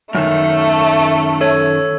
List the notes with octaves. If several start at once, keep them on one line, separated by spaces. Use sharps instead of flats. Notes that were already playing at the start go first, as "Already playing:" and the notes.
F#2 D#3 A3
A4 C#5